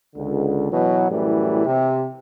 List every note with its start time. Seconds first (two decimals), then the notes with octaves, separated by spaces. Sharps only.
0.16 C#2 D3
0.71 B2 E3 F#3
1.11 F#2 A2 E3 G3
1.66 C3